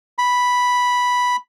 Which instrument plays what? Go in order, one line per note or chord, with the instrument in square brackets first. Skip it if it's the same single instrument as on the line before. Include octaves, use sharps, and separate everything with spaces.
[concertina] B5